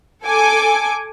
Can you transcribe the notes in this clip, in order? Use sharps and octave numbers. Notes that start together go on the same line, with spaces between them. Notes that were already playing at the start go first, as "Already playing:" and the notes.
A4 G#5 D6